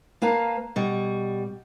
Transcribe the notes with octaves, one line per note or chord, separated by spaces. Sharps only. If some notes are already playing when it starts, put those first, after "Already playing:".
A#3 B4 F5 A5 A#5
B2 G3